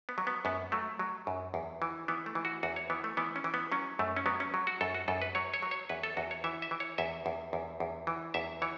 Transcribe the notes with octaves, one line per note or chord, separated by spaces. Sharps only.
B3
F#3
B3
F#2 B3
F#3 A3
F#3
F#2
E2
E3
E3 B3
A3
E3
F#4
E2 F#4
C#5
E3 B3
A3
E3 B3
C#4
E3
B3
F#3 C#4
F#2 A3
C#4
F#3 B3
C#4
F#3
F#4
F#2 A4
F#4
F#2 A4
B4
F#3 C#5
C#5
F#3
C#5
E2 B4
A4
E2 F#4
C#5
E3 E5
E5
E3
C#5
E2 E5
E2
E2
E2
E3
E2 E5
E3 C#5